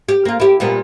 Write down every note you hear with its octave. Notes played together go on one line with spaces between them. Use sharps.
G4
A#3 F4
E4 G4
A#2 G3 B3